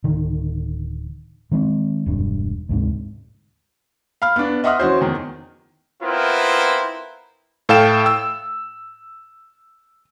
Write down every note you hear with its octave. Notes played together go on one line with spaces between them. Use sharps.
D1 D3 D#3
D#3 G#3 B3 C4
E1 G2
D2 G#2 C3
F5 B5 F6
B3 D4
D#5 E5 F#5 C6 D#6 F6
E3 C#4 F#4 C5
E2 D#3
B3 C4 E4 F4 A#4 C5
A2 A4 F5 G5 E7
E6